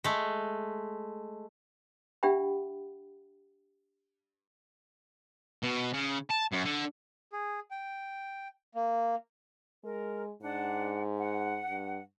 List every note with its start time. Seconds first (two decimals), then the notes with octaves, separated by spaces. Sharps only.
0.04 G#3 A3
2.23 D4 G4 E5 F#5 G5 B5
5.63 B2
5.94 C#3
6.31 A5
6.53 F#2
6.66 D3
7.33 G#4
7.71 G5
8.75 A#3
9.84 G#3 A#4
10.42 G#2 D4 F#5
11.17 F#5
11.70 G2